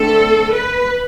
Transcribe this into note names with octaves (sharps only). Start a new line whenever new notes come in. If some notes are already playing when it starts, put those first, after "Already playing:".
Already playing: D3 A3 C4 A4
B4